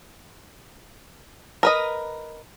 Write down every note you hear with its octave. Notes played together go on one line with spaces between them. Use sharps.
A#4 B4 D#5